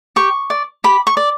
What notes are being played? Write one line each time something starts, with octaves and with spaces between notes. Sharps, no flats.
G4 C#6
D5
G4 B5
C#6
D5